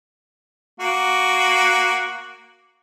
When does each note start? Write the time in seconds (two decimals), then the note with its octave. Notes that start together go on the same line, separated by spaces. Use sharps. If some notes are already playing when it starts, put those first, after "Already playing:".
0.80 A#3 F#4